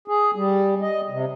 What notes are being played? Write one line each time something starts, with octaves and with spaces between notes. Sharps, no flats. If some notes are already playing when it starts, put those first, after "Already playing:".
G#4
G3
D#5
C3